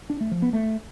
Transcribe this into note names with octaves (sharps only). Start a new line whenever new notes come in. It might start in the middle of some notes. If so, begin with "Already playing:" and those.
D4
A3
F3
B3
A3